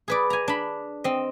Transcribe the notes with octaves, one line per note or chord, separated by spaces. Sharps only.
G#4 B4 D5
G#5 A#5
D4 B5
C4 D#5